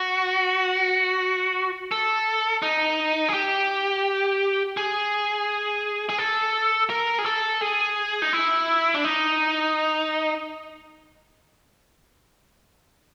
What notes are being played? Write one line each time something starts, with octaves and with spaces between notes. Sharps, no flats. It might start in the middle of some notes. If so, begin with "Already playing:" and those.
Already playing: F#4
A4
D#4
G#4
G4
G#4
G#4
A4
A#4
G#4
A4
G#4
D#4
E4
D4
D#4